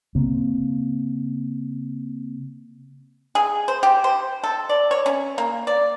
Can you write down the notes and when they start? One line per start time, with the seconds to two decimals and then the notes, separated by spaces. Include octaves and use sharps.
0.15 C#3 A#3 C4
3.35 G#4
3.68 C5
3.83 G4
4.04 C5
4.44 A4
4.69 D5
4.91 C#5
5.06 C#4
5.38 A#3
5.67 D5